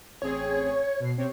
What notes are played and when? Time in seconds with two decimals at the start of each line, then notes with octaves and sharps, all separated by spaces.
0.22 A1 C4 G#4 C#5
1.00 B2 C7
1.17 C3 C4 C#5